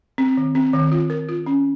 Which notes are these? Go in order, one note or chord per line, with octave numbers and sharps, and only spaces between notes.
C4
D#3
C4
D#3
F4
A#4
F4
C#4